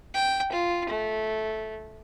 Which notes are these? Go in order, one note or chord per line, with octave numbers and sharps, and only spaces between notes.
G5
F4
A3